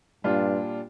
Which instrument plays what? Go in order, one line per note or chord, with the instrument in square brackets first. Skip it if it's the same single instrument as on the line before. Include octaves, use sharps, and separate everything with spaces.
[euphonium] G2 [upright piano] A#2 G3 D4 F4